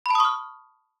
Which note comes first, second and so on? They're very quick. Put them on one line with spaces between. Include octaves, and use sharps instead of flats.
B5 A5 D#6 C#6 F6